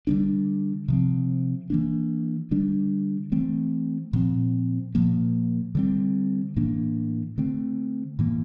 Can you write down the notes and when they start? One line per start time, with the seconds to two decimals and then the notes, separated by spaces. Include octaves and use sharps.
0.07 D3 G3 A#3 D4
0.88 C3 F3 C4
1.70 E3 A#3 D4
2.51 D3 G3 D4
3.32 E3 A3 C4
4.13 A#2 F3 C4
4.95 A#2 F3 A#3
5.75 D3 G3 C4
6.56 A2 E3 A#3 D4
7.38 D3 A3 C4
8.19 A2 E3 A#3